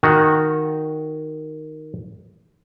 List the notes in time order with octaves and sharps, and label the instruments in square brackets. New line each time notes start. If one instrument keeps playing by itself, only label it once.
[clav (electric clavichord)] D#3 F#4